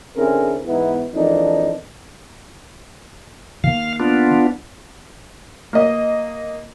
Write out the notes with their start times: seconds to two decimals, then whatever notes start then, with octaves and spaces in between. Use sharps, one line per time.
0.17 D3 C4 C#4 E4 G#4 A#4
0.67 E2 G#2 B3 D#4 E4
1.14 F2 D#3 E3 G#3 D4 D#4
3.64 D#3 A#3 F5
4.00 B3 D4 F4
5.73 A#3 D#5